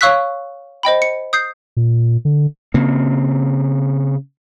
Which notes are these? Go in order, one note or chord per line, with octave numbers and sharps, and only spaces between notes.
C#5 F5 C#6 E6 F#6 B6
C5 D#5 G5 B5
C#7
D#6 G6 C7
A#2
D3
C#3 A#3 C4